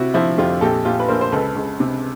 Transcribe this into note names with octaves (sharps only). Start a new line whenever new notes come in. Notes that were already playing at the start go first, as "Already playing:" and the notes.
Already playing: C3 E4 F#4
F3 E4 F#4
F2 F4 G4
A#1 G4 A4
A#1 F4 G4
B4
A#1 A#4 C5
C5
C#2 A4 B4
C#2
C3